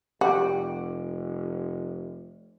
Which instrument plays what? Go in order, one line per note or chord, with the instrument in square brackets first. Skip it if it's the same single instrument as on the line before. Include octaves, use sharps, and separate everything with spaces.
[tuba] F1 [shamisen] F#4 [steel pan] G4